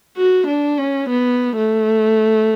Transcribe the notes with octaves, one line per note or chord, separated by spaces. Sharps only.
F#4
D4
C#4
B3
A3